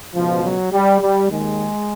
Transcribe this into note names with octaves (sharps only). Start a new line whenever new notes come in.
C#2 B2 F3
F#3
G3
G3
D#2 D#3 G#3